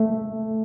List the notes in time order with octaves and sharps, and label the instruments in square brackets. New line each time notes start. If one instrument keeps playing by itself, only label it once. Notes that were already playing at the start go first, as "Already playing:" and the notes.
Already playing: [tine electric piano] A3